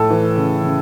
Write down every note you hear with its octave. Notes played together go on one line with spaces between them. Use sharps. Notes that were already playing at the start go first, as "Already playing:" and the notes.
Already playing: A2 A4
E3
C#3
C#3